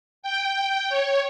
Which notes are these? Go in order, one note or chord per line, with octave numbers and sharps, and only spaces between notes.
G5
C#5